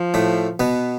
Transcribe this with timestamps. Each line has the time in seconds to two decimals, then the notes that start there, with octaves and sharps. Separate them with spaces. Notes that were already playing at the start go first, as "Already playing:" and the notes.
Already playing: F3
0.14 A2 A3
0.60 B2 B3